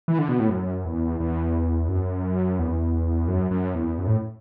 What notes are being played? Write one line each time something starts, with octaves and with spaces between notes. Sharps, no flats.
E3
D3
B2
A2
F#2
E2
E2
F#2
E2
F#2
F#2
E2
F#2
A2